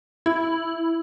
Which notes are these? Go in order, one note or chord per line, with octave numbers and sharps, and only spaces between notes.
E4